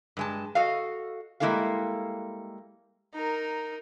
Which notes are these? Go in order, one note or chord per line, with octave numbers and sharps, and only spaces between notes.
G2 G#3 A5
F#4 A4 D#5 F5
G3 G#3 A#3 E4 A4 F5
D#4 A#4